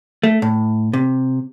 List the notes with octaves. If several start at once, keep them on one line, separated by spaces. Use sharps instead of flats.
A3
A2
C3